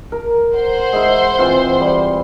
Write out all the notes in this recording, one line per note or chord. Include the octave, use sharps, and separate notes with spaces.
A#4
C5 F#5 C6
G#3 E4
E3 C4 F4
G3